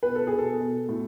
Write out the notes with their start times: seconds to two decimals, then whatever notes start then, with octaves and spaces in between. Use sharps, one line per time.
0.03 B2 B4
0.15 A4
0.27 G#4
0.32 B2
0.38 A4
0.60 B2
0.89 A2